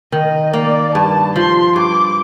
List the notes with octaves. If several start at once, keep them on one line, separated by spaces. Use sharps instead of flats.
D#3 D#5
A#3 D5
G2 A5
F3 C6
G2 D6